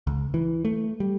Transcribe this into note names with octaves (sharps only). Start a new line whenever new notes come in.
C#2
E3
A3
G3